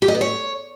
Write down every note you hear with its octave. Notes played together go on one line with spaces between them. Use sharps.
G4
D#5
B3
C#5